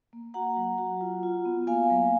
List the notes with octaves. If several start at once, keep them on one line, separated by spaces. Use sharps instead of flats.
A#3
F#4 F#5 A#5
F#3
F#4
F4
F4
B3
A#3 F5 G#5
F#3